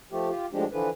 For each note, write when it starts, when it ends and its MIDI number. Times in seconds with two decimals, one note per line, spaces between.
0.12 0.30 53
0.12 0.30 57
0.12 0.30 67
0.30 0.46 65
0.30 0.46 67
0.53 0.65 45
0.53 0.65 53
0.53 0.65 56
0.53 0.65 62
0.53 0.65 67
0.72 0.89 50
0.72 0.89 52
0.72 0.89 53
0.72 0.89 71